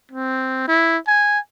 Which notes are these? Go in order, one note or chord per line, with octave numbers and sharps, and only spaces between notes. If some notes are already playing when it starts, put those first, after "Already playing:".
C4
E4
G#5